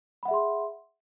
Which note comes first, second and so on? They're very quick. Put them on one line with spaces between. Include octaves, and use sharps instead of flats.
B5 F#5 E5 G#4 C6